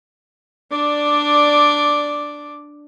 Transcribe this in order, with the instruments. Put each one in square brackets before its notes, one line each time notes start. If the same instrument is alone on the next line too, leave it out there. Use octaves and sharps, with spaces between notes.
[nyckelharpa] D4 D5